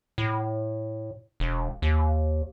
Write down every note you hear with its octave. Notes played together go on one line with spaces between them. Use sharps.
A2
E1
D#2